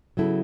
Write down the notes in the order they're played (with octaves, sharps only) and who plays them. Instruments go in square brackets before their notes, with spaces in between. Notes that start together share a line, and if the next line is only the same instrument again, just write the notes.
[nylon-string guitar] C#3 F#3 B3 E4 A4